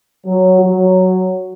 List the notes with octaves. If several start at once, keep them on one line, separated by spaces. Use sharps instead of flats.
F#3
F#3